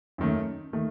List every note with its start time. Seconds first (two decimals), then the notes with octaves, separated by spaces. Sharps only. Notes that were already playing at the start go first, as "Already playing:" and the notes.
0.18 F#2 D#3 A3
0.73 D#3 A3